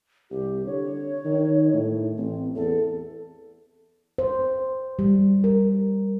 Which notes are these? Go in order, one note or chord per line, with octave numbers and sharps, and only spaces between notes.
C2 G4
D3 C#5
D#3
A2
A1 C4
E2 A4
C5
G3
A#4